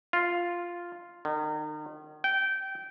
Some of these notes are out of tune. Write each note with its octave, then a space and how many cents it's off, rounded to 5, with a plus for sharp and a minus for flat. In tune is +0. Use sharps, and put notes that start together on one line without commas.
F4 +0
D#3 -35
G5 -20